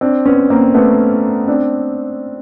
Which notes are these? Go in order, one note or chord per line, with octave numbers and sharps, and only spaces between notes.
C4 D4
B3 C#4
A#3 C4
A3 B3
C4 D4